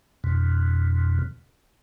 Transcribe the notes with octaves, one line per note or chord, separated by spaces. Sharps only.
F2 B2